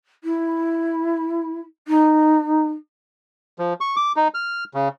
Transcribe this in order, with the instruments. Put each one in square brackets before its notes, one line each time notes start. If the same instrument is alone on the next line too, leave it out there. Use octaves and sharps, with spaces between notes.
[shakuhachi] E4
D#4
[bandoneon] F3
C#6
D6
D#4
F6
C#3